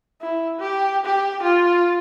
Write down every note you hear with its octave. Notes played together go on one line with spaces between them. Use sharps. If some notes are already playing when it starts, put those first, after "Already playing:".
E4
G4
G4
F4